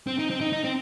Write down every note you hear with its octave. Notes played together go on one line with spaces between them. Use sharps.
C4
D#4
C4
D#4
D#4
C4